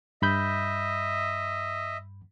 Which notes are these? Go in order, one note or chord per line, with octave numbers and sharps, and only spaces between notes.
G2 D#5 E5 B5 G6